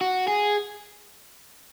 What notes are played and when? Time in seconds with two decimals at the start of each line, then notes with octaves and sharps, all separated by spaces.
0.01 F#4
0.28 G#4